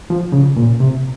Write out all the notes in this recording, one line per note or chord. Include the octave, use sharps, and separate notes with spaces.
F3
C#3
A#2
C3